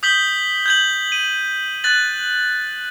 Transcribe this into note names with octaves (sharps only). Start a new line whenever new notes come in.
D#6 G6 B6 F#7 G7
G6 G#6 F#7
D#7
F#6 A6 F#7